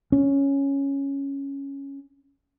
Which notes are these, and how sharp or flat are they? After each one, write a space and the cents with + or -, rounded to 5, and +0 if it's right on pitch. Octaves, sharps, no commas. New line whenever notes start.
C#4 +0